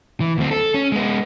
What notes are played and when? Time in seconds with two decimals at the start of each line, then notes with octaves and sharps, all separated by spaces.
0.20 E3
0.38 D2 C4
0.51 A4
0.74 C#4
0.92 G#3 B3